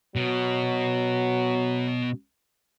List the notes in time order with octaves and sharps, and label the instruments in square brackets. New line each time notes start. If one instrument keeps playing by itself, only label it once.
[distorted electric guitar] B2 [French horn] F#3